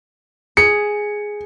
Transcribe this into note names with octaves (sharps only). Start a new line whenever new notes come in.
G#4 C#7